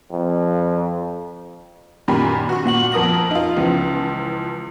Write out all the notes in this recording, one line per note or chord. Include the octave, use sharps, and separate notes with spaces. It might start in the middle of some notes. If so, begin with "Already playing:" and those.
F2
F#2 A#2 D#3 G4 G#5 B5
F#4 C#6
A#2 F#5 F#7
F2 A#4 D#6 A#6 F#7
D#4 F4
C#2 E3 F3